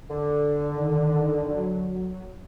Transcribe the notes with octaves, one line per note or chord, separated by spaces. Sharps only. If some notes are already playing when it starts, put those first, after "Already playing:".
D3
D#3
F#3